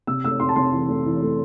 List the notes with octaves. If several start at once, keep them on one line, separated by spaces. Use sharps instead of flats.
C3 E6
A3 E6
C4 C6
A5
C3 C6
E3
A3
E3
A3